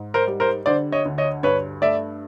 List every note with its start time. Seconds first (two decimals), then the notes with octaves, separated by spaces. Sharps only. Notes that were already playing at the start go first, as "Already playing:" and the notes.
Already playing: G#2
0.14 A#4 C5
0.27 G3
0.40 A#4 C5
0.66 D3 C5 D5
0.92 C#5 D#5
1.05 D2
1.18 C#5 D#5
1.43 G2 B4 C#5
1.82 A3 D5 E5